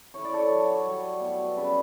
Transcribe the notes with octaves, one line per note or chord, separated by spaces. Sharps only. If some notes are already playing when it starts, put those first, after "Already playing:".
E4 C#5
D5
A4 C#5
F#3
G3
B2
C#3 B4 D5